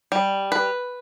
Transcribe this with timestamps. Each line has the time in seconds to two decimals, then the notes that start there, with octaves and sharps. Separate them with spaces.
0.12 G3
0.52 B4